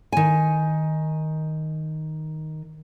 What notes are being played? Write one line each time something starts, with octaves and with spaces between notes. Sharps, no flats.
D#3 G#5